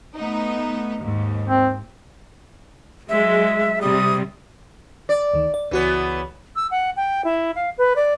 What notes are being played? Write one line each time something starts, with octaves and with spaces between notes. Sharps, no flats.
A3 B3 D#4
D#2 G#2
C4
F#3 G#3 E5
C3 G3 D#6
D5
D2 D#3
D5
C#2 E3 B3 F#4 C#5
E6
F#5
G5
E4
F5
B4
D5